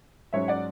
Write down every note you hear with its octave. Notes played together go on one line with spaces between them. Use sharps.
G#2 F#3 C#4 C#5 E5
D5 F#5